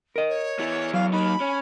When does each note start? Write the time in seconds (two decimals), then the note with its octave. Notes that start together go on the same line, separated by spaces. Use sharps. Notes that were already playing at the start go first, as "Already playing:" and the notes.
0.16 A#4 D#5
0.28 C#5
0.59 E2 E4
0.94 F#3 F5
1.12 A#3 D#4 B5
1.40 C#4